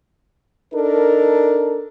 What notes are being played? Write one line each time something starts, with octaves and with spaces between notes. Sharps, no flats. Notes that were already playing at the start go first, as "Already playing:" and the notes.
D4 D#4 A4 A#4